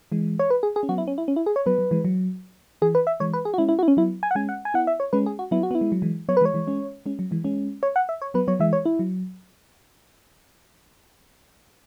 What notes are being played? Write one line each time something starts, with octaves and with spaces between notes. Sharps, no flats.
E3 G#3
C#5
B4
G#4
G#4
C#4
F#3 B3 F#4
E4
C#4
E4
C#4
E4
G#4
C#5
F#3 B3 B4
F#3
E3 G#3
F#3
E3 G#4
B4
E5
E3 G#3 C#5
B4
G#4
F#4
G#3 C#4 E4
E4
F#4
E4
C#4
F#3 B3 E4
G#5
F#5
G#3 C#4 G#5
F#5
G#5
B3 E4 F#5
E5
C#5
G#3 C#4 B4
G#4
F#4
F#3 B3 E4
F#4
B3 E4
G#3
F#3
E3 G#3
F#3 B3 C#5
B4
E3 G#3
C#5
E3 G#3
G#3 C#4
G#3 C#4
F#3
E3 G#3
G#3 C#4
C#5
F#5
E5
C#5
F#3 B3 B4
F#3 B3 C#5
E3 G#3 E5
C#5
E4
F#3